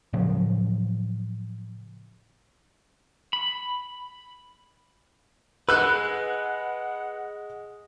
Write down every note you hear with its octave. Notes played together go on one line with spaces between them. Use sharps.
A2 C#3 F3 F#3
B5
G#3 B4 F#5 E6 F#6